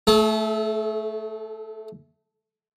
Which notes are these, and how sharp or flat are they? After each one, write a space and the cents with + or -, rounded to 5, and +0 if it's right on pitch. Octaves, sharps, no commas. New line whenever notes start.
A3 +0 A4 -45